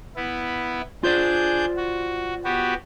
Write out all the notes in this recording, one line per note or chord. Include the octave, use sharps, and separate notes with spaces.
B3 E4
D4 F4 G#4 C5 D5 G6
F#4
B3 F#4 G4